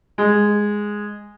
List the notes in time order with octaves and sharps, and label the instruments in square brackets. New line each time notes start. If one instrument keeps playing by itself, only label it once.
[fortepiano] G#3